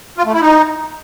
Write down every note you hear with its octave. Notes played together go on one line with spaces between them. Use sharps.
F4
A3
E4
D#4